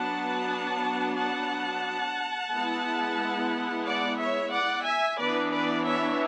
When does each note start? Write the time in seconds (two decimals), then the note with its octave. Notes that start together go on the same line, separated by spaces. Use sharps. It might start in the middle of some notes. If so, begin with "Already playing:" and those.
Already playing: F#3 B3 D4 F#5 A5
1.18 F#5 A5
2.52 G#3 B3 E4
3.86 D5 F#5
4.19 C#5 E5
4.52 D5 F#5
4.86 E5 G#5
5.19 E3 B3 D4 B4 D5
5.52 B4 D5
5.86 C#5 E5